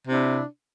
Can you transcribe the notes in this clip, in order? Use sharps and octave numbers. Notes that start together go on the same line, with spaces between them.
C3 D4 E4